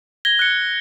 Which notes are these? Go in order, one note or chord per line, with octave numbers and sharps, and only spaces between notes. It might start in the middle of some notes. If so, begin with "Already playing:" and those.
G#6 A#6 G7
F#6 C#7